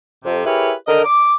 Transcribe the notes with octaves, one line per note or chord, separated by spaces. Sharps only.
F2 C3
E4 G4 G#4 A#4 B4 C#5
D3 A#4 D#5
D6